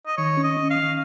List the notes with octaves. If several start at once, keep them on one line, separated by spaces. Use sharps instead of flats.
D#5
D#3 C#5
C#4
D#5
C#4
F5
D#3